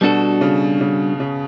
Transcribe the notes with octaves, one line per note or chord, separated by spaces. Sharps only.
B2 G3 D4 F#4 A4
C#3
C#3
C#3